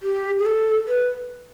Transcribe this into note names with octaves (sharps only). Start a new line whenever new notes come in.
G4
G#4
A4
B4